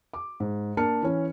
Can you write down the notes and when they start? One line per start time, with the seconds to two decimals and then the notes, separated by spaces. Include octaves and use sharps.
0.14 D6
0.40 G#2
0.77 A#3 D4 A#4 A5 F6 C#7
1.02 E3 C#4